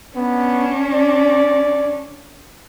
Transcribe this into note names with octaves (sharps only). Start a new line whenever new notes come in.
B3 C#4 D4
D5